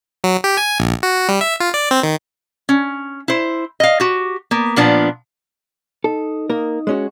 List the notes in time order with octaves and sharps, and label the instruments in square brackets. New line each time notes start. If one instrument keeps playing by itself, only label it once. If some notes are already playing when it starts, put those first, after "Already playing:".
[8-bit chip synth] F#3
G4
G#5
A#1
F#4
G3
E5
F4
D5
C4
D#3
[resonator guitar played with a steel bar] C#4
E4 C5
D#5 F5
F#4 G4
A#3 B3
A#2 F3 B3 D4
[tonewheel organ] D#4 [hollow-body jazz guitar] A4
[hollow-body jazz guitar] A#3 A#4
G#3 C#4 F#4